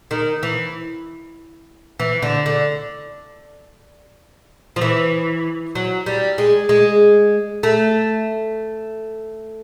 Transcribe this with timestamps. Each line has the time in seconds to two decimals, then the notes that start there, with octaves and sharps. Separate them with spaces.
0.11 D#3
0.43 E3
2.00 E3
2.22 D3
2.46 D3
4.76 F3
4.81 E3
5.75 F#3
6.06 G3
6.38 G#3
6.69 G#3
7.63 A3